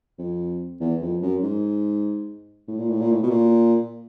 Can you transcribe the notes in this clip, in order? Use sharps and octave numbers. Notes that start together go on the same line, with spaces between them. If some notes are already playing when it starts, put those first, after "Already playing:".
F2
E2
F2
F#2
G#2
A2
A#2
A2
A#2
A2
B2
A#2